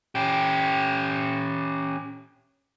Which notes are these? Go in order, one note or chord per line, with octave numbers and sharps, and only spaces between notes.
C#4 G4